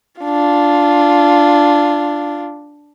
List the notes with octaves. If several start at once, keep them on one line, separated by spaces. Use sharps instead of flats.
D4 F4